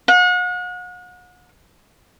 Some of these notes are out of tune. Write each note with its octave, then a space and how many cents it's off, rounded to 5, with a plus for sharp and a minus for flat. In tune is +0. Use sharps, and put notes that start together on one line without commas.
F#5 -40